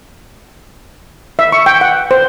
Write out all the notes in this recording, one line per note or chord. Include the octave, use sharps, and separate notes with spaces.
E5
C#6
G5
F#5
C5